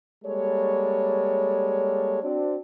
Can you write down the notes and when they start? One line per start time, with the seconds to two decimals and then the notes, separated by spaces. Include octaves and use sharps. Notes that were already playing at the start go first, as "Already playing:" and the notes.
0.25 G3 G#3 A#3 A4 C#5
2.23 C4 D4 F#4 D5